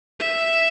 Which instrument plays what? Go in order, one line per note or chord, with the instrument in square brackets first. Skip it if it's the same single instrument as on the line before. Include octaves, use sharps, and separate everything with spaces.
[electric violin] E5